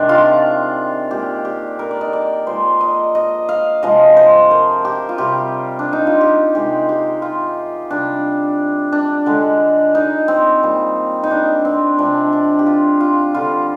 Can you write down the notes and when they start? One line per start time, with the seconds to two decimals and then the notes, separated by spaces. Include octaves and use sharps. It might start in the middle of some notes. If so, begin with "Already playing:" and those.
Already playing: C3 D#3 G#3 D4
0.09 F4
1.11 A#2 G#3 G4
1.45 G4
1.79 A#4
1.91 D5
2.01 D#5
2.13 D5
2.47 A#2 F3 G#3 C5
2.81 D#5
3.15 D#5
3.49 F5
3.83 C3 F3 G#3 D#5
4.17 C5
4.51 A#4
4.85 G4
5.09 F4
5.18 C3 G3 G4
5.79 D4
5.93 D#4
6.07 F4
6.21 G4
6.55 C3 D#3 G#3 G4
6.89 G4
7.22 F4
7.91 C3 G3 D4
8.92 D4
9.26 D3 G#3
9.95 D#4
10.28 C4
10.63 A#2 G3
11.23 D#4
11.31 D4
11.65 C4
11.98 C3 F3 G#3 D4
12.33 D4
12.59 G4
12.66 F4
13.01 F4
13.35 D3 G3 F4